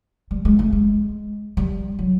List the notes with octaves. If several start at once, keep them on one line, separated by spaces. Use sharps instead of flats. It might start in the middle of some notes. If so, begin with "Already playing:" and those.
G3
G#3
A3
G#3
G3
F#3